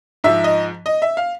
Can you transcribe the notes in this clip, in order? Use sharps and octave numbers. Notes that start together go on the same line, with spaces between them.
G#2 F3 E5
D#5
D#5
E5
F5